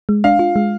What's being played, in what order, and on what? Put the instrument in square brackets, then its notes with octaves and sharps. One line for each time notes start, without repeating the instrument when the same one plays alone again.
[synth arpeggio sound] G#3
[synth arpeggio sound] D4 [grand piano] F5
[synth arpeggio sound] F4
G#3